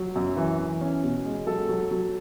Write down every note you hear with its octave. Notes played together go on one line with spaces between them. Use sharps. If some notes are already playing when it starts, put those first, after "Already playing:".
Already playing: F#3
F#2
E3
E3
C#4
B2
G#3
F#3 A4
F#3
F#3